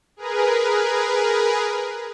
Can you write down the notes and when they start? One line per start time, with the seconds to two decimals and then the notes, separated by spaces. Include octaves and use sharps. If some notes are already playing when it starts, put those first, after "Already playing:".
0.17 G#4 A#4 B4